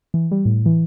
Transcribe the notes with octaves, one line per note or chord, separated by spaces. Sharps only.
E3
G3
A2
E3